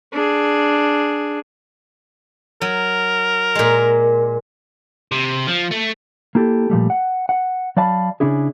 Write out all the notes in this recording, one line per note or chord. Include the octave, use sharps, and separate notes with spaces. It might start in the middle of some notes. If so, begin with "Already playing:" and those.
D4 G#4
F#3 A#4
A#2 G#3
C3
F3
A3
A#3 E4 G4 A4
A#2 F3 G3 A3
F#5
F#5
F#3 D5 F5 A5 B5
C#3 C#4 D4 E4 G#4